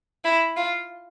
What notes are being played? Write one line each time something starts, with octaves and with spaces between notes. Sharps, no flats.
E4
F4